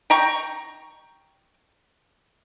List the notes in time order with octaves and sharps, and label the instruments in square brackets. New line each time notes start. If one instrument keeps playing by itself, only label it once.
[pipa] G5 A#5 C#6